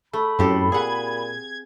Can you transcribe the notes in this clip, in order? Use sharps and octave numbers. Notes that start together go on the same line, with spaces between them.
A3 B5
F#2 A2 C4 G4 A4
A#2 G#4 F#5 G#6